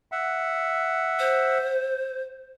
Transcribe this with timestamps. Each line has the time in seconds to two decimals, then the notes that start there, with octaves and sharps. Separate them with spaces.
0.12 E5 F#5
1.19 C5